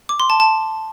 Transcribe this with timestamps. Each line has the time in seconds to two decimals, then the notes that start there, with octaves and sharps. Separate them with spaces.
0.09 D6
0.20 C6
0.30 A5
0.40 A5